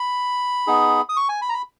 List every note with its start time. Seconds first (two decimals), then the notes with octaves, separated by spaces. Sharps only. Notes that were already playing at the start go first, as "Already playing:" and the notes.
Already playing: B5
0.67 B3 D#4 G#4
1.09 D#6
1.17 C#6
1.29 G#5
1.42 B5
1.49 A#5
1.54 B5